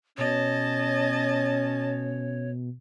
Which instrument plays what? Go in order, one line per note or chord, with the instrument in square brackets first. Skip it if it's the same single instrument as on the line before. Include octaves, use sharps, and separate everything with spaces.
[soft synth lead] B2 [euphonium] C#4 [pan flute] C#5 [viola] D#5 A5